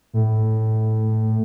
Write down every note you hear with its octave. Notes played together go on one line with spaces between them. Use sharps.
A2